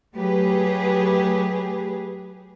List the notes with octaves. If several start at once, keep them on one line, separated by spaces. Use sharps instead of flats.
F#3 A3 G4 G#4 B4